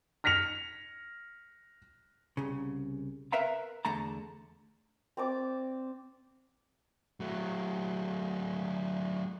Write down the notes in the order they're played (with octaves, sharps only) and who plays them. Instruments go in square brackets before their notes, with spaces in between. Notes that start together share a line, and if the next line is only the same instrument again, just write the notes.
[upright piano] F6 A#6 B6 C#7 F7
[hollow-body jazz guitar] C2 C#3
A#4 B4 E5 F5 A#5
E2 D3 A3 A5 A#5
[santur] C4 D5 D6
[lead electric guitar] F#3 A3